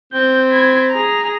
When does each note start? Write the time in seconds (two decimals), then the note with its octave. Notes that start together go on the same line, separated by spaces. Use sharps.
0.13 C4 G6
0.50 B5 G#6
0.91 G#4 A#5